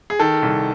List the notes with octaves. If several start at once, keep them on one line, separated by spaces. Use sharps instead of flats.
G#4
D#3 A4
C2